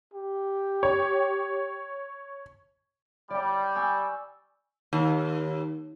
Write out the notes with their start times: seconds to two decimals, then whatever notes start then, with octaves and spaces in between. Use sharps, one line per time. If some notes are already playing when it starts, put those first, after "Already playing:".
0.14 G4
0.83 C#5
3.30 G3 D5 G5
3.75 G#5 C#6 E6
4.93 D#2